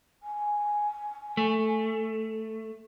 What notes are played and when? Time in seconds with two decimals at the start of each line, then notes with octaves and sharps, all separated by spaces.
0.23 G#5
1.37 A3